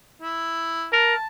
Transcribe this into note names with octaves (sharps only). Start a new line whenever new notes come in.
E4
A#4 A5